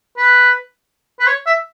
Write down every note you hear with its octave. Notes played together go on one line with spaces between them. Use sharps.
B4
B4
C#5
E5